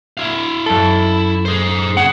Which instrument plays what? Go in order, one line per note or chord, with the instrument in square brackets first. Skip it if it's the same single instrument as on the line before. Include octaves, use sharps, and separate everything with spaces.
[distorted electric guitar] E4 F5
[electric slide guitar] F#2 A4
[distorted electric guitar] G#4 C5
[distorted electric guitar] C#4 G#4 [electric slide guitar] F#5